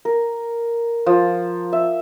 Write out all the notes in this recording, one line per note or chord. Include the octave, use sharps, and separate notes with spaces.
A#4
F3
E5